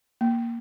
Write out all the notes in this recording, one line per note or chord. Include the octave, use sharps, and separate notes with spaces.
A#3